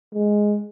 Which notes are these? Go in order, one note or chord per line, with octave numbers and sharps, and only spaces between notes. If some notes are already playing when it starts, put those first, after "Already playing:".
G#3